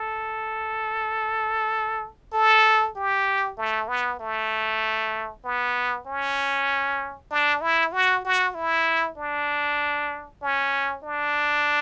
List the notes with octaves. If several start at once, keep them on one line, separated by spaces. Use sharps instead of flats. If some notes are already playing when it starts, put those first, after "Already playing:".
Already playing: A4
A4
G4
A3
B3
A3
B3
C#4
D4
E4
F#4
F#4
E4
D4
C#4
D4